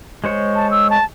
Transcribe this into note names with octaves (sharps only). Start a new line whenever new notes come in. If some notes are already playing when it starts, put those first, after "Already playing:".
G#3 C5 C#5
A5
E6
A5